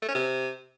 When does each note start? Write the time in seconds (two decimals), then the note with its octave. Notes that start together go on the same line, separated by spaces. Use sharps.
0.02 A3
0.09 C#4
0.15 C3